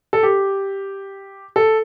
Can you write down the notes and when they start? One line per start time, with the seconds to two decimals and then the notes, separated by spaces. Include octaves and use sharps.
0.13 A4
0.23 G4
1.56 A4